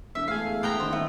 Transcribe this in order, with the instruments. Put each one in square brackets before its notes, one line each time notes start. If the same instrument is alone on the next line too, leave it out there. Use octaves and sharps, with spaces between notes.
[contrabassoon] E1 [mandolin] E5
[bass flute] A3 [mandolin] G#4 F5
[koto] B3 G5 A#5
[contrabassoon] E2 [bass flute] D#3 [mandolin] C5
[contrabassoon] D#1 [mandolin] A3